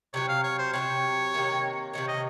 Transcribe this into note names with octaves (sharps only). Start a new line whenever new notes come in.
C3 D#3 F#3 C#5
F5
C#5
C5
C3 D#3 F#3 C#5
C3 D#3 A#3
C3 D#3 A#3 C#5
D#5